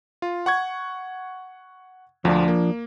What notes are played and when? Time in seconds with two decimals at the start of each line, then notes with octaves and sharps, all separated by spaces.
0.22 F4
0.46 F#5 C#6 G#6
2.25 D2 F3 D4 F4
2.48 A#3